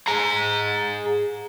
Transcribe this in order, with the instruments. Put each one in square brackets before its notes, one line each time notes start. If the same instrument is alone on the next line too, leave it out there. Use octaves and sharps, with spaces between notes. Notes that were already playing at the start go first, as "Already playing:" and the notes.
[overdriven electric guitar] G#4 A#5